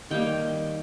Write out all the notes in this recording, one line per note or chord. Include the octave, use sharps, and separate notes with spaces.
D#3 G3 A#3 G5